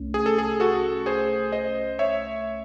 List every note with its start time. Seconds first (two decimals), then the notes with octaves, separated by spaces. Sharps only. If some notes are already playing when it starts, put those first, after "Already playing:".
Already playing: C2 A3 C#4
0.14 G#4
0.26 A4
0.38 G#4
0.60 F#4 A4
1.06 G#4 C5
1.52 C5 D#5
1.99 C#5 E5